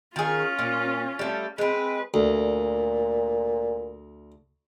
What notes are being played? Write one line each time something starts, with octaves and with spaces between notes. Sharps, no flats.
D#3 C#4 F4 G#4
A#2
G3 A3
G#3 C4 B4
D2 A#2